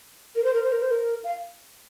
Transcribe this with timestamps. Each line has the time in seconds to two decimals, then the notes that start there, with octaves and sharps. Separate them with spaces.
0.35 A#4
0.44 C5
0.53 A#4
0.63 C5
0.71 A#4
0.81 C5
0.90 A#4
1.23 F5